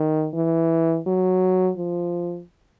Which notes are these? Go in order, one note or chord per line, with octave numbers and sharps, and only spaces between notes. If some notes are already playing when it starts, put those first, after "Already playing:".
Already playing: D#3
E3
F#3
F3